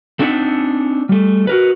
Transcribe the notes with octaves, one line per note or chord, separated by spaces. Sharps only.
A3 C4 D4 D#4 E5 F#5
G3 A3
F#4 A#4 B4